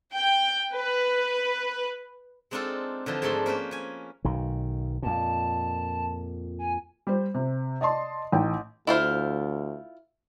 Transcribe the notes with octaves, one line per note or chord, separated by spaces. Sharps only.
G5
B4
G#3 C4 D4 D#4 F4 A4
D3 E3 F3 D#4
G#2 G#3 A3 D4 A4 C6
A#3 C#4 B4 C5
C#4 G#5
B1 D#3
F2 A#2 A5
G#5
G3 C5
C3
D5 D#5 A5 C6
A1 D#4 G5
D2 E4 F4 C5